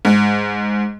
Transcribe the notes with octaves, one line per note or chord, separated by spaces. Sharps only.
G#2